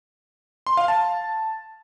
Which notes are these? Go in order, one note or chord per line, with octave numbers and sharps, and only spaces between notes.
C6
F5
A5